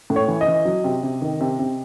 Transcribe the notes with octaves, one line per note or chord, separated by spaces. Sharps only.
A2
C#5
E3
D#5
E3
F#3
C3
C3
D#3
C3
C3